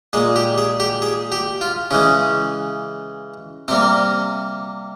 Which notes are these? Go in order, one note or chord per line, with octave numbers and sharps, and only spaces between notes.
A#2 G#3 G#4
G4
G#4
G4
G#4
G4
F4
C#3 E3 G#3 C#4
C3 G3 A#3 C4